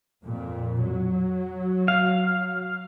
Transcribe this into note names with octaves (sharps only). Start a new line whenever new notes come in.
F2 A#2
F#3
F5